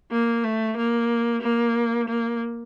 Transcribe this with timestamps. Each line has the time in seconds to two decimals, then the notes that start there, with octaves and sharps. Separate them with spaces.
0.11 A#3
0.44 A3
0.77 A#3
1.42 A#3
2.09 A#3